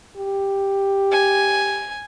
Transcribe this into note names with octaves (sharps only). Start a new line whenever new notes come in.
G4
G#5